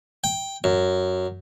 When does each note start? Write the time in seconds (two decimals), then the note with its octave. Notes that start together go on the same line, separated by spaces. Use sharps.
0.24 G5
0.64 F#2